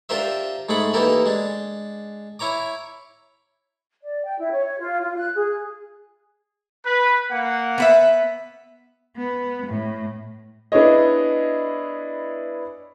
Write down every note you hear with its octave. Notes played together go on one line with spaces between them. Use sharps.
D4 F4 G4 A#4 C5 E5
G#2 A3 G#4 F#5 B5
E3 A#3 D#4 G4 A4 A#4
G#3 D4
E4 C#5 A#5 D6
D5
G5
E4
C#5
F4
F4
F#6
G#4
B4
A#3 F#5
B3 B4 E5
B3
A2
B3 D4 E4 G#4 C#5 D#5